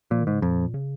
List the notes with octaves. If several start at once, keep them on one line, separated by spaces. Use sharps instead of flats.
A#2 F3
D#3
G#2
C#3
F2 A#2
C#3